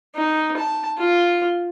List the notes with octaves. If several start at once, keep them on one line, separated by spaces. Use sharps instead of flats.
D#4
A5
F4